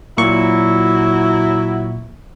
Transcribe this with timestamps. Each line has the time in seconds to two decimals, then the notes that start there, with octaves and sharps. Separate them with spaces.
0.18 A#2 F#3 E4 C#6